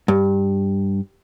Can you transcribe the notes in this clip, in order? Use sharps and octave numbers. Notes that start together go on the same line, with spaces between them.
G2